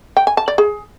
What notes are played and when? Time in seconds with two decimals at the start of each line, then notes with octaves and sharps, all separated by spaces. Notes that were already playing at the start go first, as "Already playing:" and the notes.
0.17 G5
0.27 G#5
0.37 A5
0.48 D5
0.58 G#4